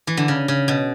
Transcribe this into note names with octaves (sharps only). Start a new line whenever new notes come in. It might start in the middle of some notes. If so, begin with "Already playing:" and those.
E3
D3
C#3
C#3
B2